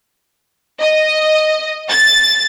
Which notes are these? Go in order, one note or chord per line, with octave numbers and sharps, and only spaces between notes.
D#5
A6